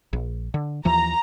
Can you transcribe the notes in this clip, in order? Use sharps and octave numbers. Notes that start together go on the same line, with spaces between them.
A#1
D3
D#2 E3 F3 A#5